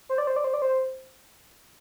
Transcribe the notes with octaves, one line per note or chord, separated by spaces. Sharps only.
C5
D5
C5
D5
C5
D5
C5